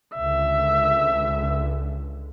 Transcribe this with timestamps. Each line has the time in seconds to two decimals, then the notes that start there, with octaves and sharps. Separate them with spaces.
0.16 C#2 D3 E5